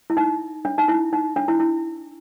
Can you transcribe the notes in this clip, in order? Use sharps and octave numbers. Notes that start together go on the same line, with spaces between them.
E4
D#4
D4
D#4
E4
D#4
D4
E4
E4